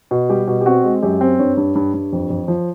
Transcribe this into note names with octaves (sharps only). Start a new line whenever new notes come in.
B2
G3 G4
B2
G4
C4 F#4
G#3
F#2 G4
C4
G2 C#5
G2
G2
G2
F2
F2
F3